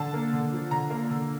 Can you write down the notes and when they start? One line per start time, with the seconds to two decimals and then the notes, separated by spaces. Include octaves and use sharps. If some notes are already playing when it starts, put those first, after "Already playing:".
Already playing: D3 A5
0.14 A#3
0.33 D3
0.52 F3
0.71 D3 A#5
0.90 A#3
1.10 D3